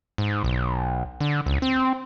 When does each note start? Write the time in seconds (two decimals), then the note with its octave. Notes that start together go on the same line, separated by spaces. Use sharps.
0.18 G#2
0.44 B1
1.20 D3
1.46 C#2
1.62 C4